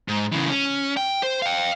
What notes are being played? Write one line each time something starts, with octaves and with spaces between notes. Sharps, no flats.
G#2
C#3 E3
C#4
G5
C5
F5 G5